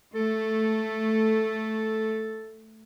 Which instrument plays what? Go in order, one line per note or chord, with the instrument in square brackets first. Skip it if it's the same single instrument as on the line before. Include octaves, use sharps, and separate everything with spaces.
[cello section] A3 [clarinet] A4